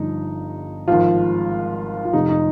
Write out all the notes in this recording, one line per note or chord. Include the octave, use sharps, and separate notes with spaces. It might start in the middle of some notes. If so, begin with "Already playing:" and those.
Already playing: G1 G2 F3 D#4
G#1 G#2 F3 F4
F4
F1 F2 C3 D#4
D#4